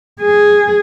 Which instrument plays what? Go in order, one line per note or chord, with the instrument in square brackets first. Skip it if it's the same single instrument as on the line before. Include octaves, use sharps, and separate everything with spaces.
[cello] G#4